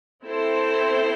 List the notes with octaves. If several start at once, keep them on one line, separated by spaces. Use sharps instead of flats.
C4 E4 A4 C5